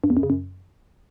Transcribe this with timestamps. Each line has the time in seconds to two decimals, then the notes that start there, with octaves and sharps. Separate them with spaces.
0.04 G2
0.10 E2
0.17 F#2
0.23 C#3
0.30 F#2